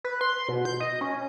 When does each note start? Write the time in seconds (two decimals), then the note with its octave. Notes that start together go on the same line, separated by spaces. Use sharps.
0.04 B4
0.21 C6
0.49 B2
0.65 G6
0.80 D#5
1.01 C#4